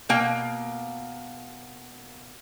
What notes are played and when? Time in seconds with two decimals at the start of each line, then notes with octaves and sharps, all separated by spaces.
0.09 B2 A#3 G5